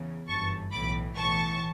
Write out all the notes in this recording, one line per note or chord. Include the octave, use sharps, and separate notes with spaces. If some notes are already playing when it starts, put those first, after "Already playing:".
Already playing: E2 C#3 E3
G1 F#2 E3 A5 C#6
B1 A2 E3 B5 D6
B1 A2 E3 A5 C#6